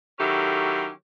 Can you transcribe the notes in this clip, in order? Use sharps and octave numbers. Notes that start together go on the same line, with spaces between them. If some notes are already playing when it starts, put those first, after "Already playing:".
D#3 F#3 C#4 E4 G4 A4